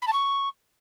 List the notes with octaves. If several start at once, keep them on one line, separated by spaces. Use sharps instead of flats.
B5
A5
C#6